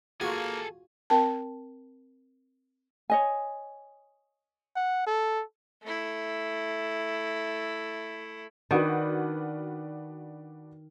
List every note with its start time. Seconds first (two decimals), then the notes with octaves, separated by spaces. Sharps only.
0.21 A#3 F4 F#4 G#4 A4 G#5
1.10 C4 A#4 G5 A5
3.10 C#5 D#5 G#5
4.76 F#5
5.06 A4
5.83 A3 E4
8.71 D#3 D4 F#4 B4